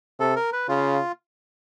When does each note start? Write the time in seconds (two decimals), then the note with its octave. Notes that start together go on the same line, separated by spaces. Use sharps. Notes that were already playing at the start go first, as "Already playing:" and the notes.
0.19 C3 A4
0.36 A#4
0.53 B4
0.68 C#3 F4